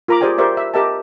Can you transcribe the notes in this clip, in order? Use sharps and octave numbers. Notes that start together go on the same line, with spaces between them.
F4 A#4 A#5 B5 D6
G4 G#4 C5 D5 G5 G#5
G4 A#4 C5 D5 E5 C#6
E5
G4 A#4 D#5 E5 G5 A5